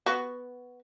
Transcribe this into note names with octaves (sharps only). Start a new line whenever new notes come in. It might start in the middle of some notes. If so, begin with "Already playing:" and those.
B3 F#4